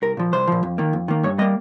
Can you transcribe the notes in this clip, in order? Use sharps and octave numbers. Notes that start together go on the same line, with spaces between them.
C2 A#4
A#2 F3
C2 C5
A#2 F3
F2
D#3 A#3
F2
D#3 A#3
G2 C#5
G3 A#3 D#5